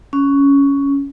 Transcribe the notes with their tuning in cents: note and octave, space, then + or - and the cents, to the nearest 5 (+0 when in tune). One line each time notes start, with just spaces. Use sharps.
C#4 +10